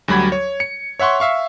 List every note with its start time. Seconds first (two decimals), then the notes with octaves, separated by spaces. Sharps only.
0.08 D2 F#3 G3 B5 G#6
0.32 C#5
0.60 C#7
0.99 C#5 E5 F#5 C6 C#6
1.20 E5 F5 C#6